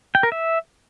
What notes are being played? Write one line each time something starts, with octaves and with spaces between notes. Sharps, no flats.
G5
A#4
E5